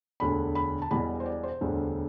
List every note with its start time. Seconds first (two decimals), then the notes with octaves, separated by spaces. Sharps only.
0.20 E1 D2 D3 B5
0.55 B5
0.82 A5
0.91 E1 E2 B2 G3 B5
1.20 C5
1.26 D5
1.43 C5
1.61 E1 D2 D3 G3